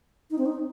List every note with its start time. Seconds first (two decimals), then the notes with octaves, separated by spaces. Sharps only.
0.31 D#4
0.38 C4
0.46 D#4